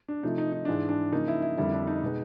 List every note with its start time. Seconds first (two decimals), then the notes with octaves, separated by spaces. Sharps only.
0.08 D4
0.23 C3 F3 A3 D#4
0.38 D#4
0.52 D#4
0.65 G#2 E3 G#3 D4
0.89 D4
1.12 C#3 F3 A#3 D#4
1.28 E4
1.42 E4
1.57 F2 D3 G3 A#3 E4
1.72 D4
1.87 D#4
2.02 B2 G#3 B3